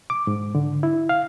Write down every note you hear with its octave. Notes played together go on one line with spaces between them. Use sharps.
D6
G#2
D3
E4
F5